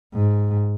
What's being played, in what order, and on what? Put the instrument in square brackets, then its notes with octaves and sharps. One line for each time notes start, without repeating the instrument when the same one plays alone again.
[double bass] G#2